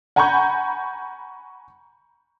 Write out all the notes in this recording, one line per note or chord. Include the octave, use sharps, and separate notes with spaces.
F#5 G#5 A#5 B5 C#6 G6